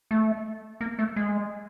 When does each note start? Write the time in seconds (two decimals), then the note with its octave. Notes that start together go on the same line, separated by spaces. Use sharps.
0.11 A3
0.81 A#3
0.99 A3
1.16 G#3